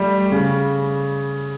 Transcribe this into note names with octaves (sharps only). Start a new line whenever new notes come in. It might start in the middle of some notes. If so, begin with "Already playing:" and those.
Already playing: G3 A3
C#3